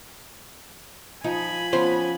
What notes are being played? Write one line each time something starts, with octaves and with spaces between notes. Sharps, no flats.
F3 D#4 G#5 B5
F3 B3 C#4 F4 C5